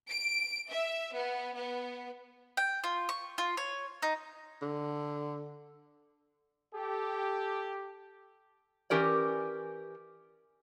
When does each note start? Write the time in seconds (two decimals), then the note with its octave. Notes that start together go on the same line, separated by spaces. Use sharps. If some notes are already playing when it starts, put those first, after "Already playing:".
0.10 D7
0.69 E5
1.14 B3
1.56 B3
2.57 G5
2.84 F4
3.09 C#6
3.38 F4
3.57 C#5
4.02 D#4
4.62 D3
6.74 G4 A4
8.90 E3 C#4 G4 A#4 D5